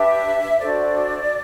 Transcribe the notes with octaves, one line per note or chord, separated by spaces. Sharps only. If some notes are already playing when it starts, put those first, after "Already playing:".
Already playing: D4 G4 B4 E5
D4 F#4 A4 C5 D5